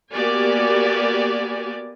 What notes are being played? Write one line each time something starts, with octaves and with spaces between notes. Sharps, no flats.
A#3 B3 F#4 G4 D5 G#5